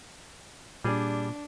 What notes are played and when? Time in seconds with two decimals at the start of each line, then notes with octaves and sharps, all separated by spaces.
0.85 A#2 G3 D4 G#4